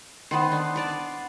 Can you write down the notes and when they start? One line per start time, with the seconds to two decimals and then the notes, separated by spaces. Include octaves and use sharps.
0.31 D#3 B3 B4 C5 C6
0.52 D4
0.76 B4 D5 A5